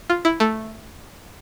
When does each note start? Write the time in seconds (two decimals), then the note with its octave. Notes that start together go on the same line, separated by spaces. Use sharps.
0.10 F4
0.25 E4
0.40 A3